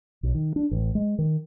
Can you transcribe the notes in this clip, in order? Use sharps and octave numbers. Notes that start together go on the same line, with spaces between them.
B1
D#3
D4
A1
G#3
D#3